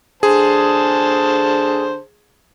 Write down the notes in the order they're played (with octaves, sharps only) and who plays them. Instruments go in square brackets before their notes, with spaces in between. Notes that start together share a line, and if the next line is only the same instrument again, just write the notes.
[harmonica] D3 C5 A5 [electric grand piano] G#4